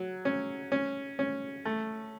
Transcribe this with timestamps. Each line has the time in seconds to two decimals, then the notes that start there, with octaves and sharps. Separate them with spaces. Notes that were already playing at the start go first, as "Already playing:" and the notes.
Already playing: F#3
0.25 C#4
0.72 C#4
1.19 C#4
1.65 A3